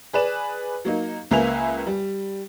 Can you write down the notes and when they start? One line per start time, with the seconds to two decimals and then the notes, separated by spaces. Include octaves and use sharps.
0.13 G#4 B4 D5 E7
0.85 F#3 A#3 D#4
1.31 C#2 A#3 B4 E5 G#5 F7
1.87 G3